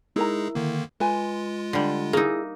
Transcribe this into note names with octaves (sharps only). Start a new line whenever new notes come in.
G#3 D#4 E4 G#4 A#4 A#5
D3 D#3 A#3
G#3 F4 B4 G#5
D3 G3
A#3 D#4 E4 G#4